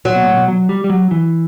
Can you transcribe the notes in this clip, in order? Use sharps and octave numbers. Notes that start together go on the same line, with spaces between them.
F#3
B2
A2
B2
F#3
G3
G3
F#3
E3